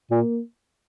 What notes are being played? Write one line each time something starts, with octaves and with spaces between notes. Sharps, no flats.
A#2 A#3